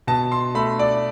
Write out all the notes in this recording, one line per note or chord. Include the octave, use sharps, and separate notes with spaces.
B2 A5
C6
A3 B5
D5